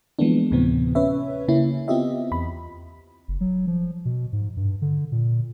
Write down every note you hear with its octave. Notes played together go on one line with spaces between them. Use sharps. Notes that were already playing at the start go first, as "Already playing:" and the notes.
E3 F3 G#3 A#3 B3 D4
D2 A2 C3 E3 B3 C4
C#4 B4 C#5 E5
C#3 A#3 C#4 E4
B3 C4 F4 G4 D#5 E5
E2 B5
F#1
F#3
F3
B2
G#2
G2
D3
A#2